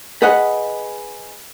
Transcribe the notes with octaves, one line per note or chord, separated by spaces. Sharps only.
G#4 B4 D#5 F#5